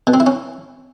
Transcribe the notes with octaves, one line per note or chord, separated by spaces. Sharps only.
B2
C4
E4
C#4